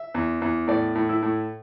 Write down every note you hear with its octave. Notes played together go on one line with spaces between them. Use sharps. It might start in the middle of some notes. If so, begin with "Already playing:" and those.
Already playing: E5
E2
E2
A2 D5
A2
E4
A2